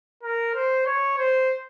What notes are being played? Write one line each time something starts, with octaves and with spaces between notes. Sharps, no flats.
A#4
C5
C#5
C5